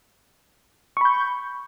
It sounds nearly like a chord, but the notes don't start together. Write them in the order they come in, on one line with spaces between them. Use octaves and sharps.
C#6 B5 G6